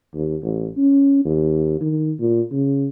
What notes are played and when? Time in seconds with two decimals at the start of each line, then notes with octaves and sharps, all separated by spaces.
0.14 D#2
0.43 A1
0.77 C#4
1.25 D#2
1.81 D#3
2.20 A#2
2.52 C#3